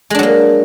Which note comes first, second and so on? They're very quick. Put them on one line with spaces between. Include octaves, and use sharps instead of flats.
G#3 D4 F#3 A#3